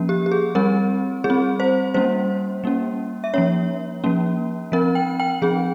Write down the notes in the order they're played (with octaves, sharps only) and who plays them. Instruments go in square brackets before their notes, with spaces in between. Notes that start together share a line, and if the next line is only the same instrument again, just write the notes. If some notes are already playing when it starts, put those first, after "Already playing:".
Already playing: [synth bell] F3 A#3 C#4
G4
G4
G#4
G3 C4 A#4
G3 G#4
C4
C5
G3 A#3 C#4 C5
G3 A#3 C#4
E5
F3 A#3 C#4 C#5
F3 A#3 C#4
F3 C4 A#4
G5
G5
F3 C4 G#4